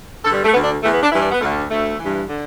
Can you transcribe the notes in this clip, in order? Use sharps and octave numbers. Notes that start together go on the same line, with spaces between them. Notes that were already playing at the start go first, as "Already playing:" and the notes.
G2 D3 A4
G3
A3
D2 D3 B3
D4
E2 E3 A3
B3
D4
G2 E3 E4
D4
B3
D2 D3 A3
D2 D3 A3
G2 E3
D3